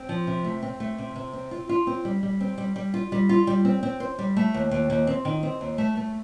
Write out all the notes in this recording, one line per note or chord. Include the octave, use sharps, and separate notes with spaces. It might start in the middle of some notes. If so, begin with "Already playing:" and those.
Already playing: C4
F3
C3
A3
C4
A3
C3
C3
C4
F4
F4
C4
G3
G3
C4
G3
G3
F4
G3
F4
G3
C4
C4
C5
G3
A3
D#2
D#2
D#2
C4
D#3
C4
D#2
A3
A3